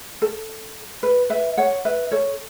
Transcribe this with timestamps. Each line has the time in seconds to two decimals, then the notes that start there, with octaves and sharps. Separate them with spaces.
0.22 A4
1.03 B4
1.30 B4 E5
1.57 C#5 F#5
1.85 B4 E5
2.11 A4 C#5